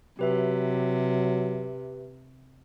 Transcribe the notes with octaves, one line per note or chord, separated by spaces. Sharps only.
C3 F#3 G4 B4 E5